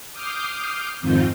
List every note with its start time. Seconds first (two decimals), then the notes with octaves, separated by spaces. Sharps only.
0.12 D6 D#6 F6 G6 C7
1.00 F2 G#2 D#3 C4 F4 G6